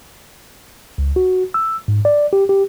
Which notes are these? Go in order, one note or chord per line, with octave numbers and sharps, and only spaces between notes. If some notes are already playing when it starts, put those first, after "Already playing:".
C#2
F#4
E6
G#2
D5
G4
G4